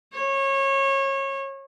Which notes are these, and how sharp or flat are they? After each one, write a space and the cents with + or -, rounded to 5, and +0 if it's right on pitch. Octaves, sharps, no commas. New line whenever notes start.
C#5 -25